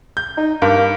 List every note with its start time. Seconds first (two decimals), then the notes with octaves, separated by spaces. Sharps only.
0.17 G6
0.37 D#4
0.62 G2 A#3